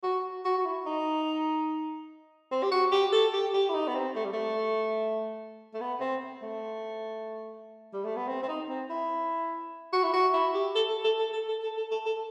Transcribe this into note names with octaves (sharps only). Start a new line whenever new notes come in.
F#4
F#4
F#4
E4
D#4
C4
G4
F#4
G4
A4
G4
G4
E4
D#4
B3
C4
A3
G3
A3
A3
B3
C4
A3
G3
A3
B3
C4
C4
D#4
C4
E4
F#4
E4
F#4
E4
G4
A4
A4
A4
A4
A4
A4
A4
A4
A4
A4